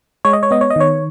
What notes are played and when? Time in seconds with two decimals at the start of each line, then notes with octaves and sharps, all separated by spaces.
0.25 G#3 C#5
0.33 D#5
0.43 C#5
0.51 B3 D#5
0.61 C#5
0.70 D#5
0.76 D#3 C#5